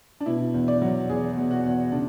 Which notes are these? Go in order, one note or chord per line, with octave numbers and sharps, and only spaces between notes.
D4
B2 E4
E2
D5
F#3
E2 G#4
B2
F#4
E2
C#3 D4